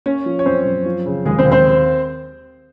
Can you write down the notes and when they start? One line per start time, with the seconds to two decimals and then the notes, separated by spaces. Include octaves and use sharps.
0.06 A#3 C#4 C#5
0.26 F3
0.39 C#5
0.46 F#2 C4 C5
0.65 F#2
0.86 F3
1.06 C#3
1.25 D#2 G#3 G#4
1.38 C4 C5
1.45 D#2
1.52 C4 C5